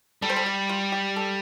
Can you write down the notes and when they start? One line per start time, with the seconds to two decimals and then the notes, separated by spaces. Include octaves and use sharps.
0.22 G3 A4
0.29 C5
0.36 A4
0.46 G4
0.69 F4
0.92 G4
1.16 A4